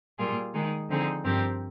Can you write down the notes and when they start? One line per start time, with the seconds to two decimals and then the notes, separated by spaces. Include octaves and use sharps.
0.18 A#2 G3 A#3 F4 G#4
0.53 D#3 G#3 D#4 G#4
0.89 D3 F3 C4 D#4 G#4
1.24 G2 F3 C4 G4 A#4